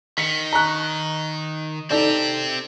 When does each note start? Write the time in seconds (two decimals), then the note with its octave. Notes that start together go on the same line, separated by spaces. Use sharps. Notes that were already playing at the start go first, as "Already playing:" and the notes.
0.18 D#3 B6 C#7
0.53 A#5 C#6 F#6
1.91 C4 D#4 G4 A4 D5